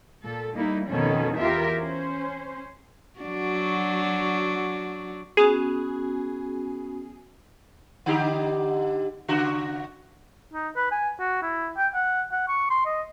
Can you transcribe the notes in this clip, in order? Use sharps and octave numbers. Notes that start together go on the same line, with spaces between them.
A#2 A4
G3 A#3 D#4 E4
F2 B2 D#3 C#4 A4
E2 F4 G4 A#4 E5
C#4 C5
F#3 D4 F#4
B3 C#4 F#4 G#4
D3 D#4 G4
C#3 F#4
D#4
B4
G#5
F#4
E4
G5
F#5
F#5
C#6
C6
D#5